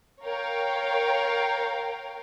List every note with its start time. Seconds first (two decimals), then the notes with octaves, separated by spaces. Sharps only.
0.23 A#4 C#5 F5 G5